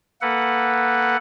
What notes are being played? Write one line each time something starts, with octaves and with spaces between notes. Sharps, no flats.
A#3 A4 B4 F#5